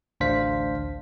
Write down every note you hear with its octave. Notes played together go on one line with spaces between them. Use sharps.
A1 D2 D4 C5 F5 B6